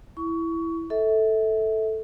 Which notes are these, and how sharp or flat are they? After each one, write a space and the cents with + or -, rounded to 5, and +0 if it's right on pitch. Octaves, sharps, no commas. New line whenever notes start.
E4 +0 C#6 +25
A4 +0 E5 -30